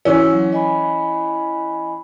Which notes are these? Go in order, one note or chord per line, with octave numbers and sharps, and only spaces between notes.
E3 C#4 F#4 E6
F#3
D#5 G#5 B5